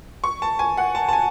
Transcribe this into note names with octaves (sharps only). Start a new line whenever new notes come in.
C#6
A5
G#5
F#5
A5
A5
G#5